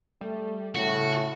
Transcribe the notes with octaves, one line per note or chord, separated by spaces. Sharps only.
G3 A3
A2 C#3 F#4